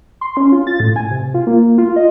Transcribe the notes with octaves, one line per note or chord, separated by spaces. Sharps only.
C6
C#4
F4
A6
A2
G#5
C3
F4
A#3
F4
D#5